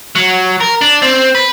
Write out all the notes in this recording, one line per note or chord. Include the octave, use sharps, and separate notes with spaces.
F#3
A#4
D4
C4
B4